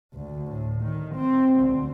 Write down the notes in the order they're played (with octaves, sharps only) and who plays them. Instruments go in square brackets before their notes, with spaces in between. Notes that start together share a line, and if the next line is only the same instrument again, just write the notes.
[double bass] D2
A2
D#3
C4
D2